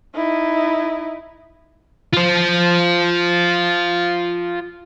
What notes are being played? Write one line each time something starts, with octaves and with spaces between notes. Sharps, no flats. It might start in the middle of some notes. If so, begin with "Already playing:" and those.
D#4 E4
F4 C5